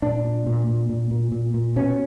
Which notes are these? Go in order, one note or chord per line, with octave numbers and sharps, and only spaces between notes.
A#2 D4
A#2
A#2
A#2
A#2
A#2
A#2
A#2
B2 C#4